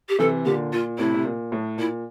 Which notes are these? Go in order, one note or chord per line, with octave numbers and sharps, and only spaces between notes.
G4
C3 E3 A4
A#2 D3 G4
A#2 F4
A2 C3 E4
C3
A#2
A2
A#2 E4